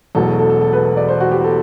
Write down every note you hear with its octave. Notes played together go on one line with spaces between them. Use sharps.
E1 E2 B2 F#3 A3 A4
A4
A4
A4
B4
D5
C5
F#4
G4
A4